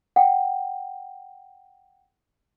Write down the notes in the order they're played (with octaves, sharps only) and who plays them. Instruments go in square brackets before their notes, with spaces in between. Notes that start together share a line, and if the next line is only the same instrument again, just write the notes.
[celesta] F#5 G5